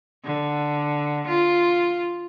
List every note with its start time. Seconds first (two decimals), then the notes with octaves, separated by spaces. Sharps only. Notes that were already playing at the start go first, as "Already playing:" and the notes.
0.24 D3
1.28 F4